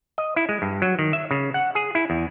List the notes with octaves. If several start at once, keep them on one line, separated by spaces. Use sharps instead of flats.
D#5
E4
G#3
G2
F#3
D#3
E5
C#3
F#5
G#4
E4
E2